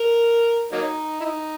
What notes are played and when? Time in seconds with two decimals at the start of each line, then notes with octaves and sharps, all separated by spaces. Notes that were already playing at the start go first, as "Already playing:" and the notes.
Already playing: A#4
0.73 F#3 A#3 D#4
1.20 E4
1.24 D#4